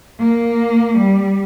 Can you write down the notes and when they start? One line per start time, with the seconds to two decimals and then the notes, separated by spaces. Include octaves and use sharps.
0.19 A#3
0.98 G3